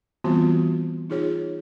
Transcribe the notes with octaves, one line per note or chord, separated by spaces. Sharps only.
E3 G3 B3 C4 F4 F#4
D#4 F4 G#4 C#5